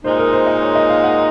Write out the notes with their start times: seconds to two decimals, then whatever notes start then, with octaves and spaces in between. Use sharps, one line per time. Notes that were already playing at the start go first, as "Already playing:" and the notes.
0.04 A#2 G#3 D#4 C5
0.18 A#4
0.33 C5
0.47 D#5
0.61 C#5
0.75 D#5
0.89 F5
1.04 F#5